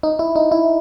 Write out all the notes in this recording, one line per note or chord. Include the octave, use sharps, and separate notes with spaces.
D#4
E4
D#4
E4